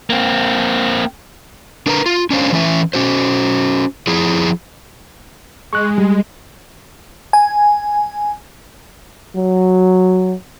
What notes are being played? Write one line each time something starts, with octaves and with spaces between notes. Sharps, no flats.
A#3 C4
D4 A#4 B4 A#5
F4
C#4 D4 C5 F5
E3 C#4 E5
C#4 F#4 C5
F3 E4 G#4
G#3 C#6 F#6
G3
G#5
F#3